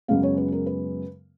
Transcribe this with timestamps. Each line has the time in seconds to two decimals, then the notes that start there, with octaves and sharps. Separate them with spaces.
0.08 F#2 C#3 G#3 B3 F5
0.23 C#5
0.37 B4
0.52 A#4
0.66 B4